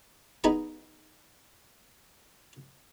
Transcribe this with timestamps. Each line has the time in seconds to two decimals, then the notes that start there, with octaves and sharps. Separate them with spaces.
0.44 B3 D#4 G#4 D#5 A#5 B5